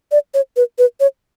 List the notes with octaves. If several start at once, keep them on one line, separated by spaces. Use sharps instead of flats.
D5
C#5
B4
B4
C#5